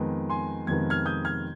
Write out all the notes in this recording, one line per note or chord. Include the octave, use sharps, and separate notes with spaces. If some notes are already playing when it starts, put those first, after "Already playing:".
Already playing: F2 D#3 G#3 B3
G#5 C6
F2 C3 D#3 G#3 B3 G#6
F6 G#6
D#6 G6
F6 G#6